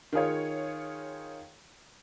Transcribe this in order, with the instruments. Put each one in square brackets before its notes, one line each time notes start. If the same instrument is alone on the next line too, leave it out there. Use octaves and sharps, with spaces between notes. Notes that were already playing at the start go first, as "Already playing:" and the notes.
[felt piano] D#3 F4 G#4 C#5